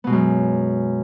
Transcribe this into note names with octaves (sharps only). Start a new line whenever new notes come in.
F#2 B2 G#3 B3